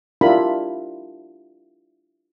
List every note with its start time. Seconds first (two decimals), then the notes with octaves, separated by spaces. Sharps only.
0.21 D4 E4 F4 G4 A#4 B5